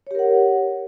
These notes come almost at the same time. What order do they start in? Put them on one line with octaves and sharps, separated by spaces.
C#5 G4 A#4 F#5